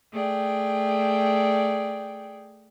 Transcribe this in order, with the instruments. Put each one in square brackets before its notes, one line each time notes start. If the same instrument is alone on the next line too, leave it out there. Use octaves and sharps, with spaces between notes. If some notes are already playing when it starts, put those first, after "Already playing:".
[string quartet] A3 G#4 D5 G5